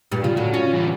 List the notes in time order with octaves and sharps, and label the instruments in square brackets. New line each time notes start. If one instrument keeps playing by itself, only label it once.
[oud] G2 A#2 G3
[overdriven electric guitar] C#3 [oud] F4
[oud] A2 [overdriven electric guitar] F#3
[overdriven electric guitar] C#4 [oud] F4 F#4
[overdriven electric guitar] E3 G3